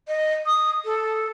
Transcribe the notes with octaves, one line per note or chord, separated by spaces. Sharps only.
D#5
D#6
A4